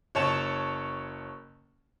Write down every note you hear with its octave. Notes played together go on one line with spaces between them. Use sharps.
F#1 C#5 A5 E7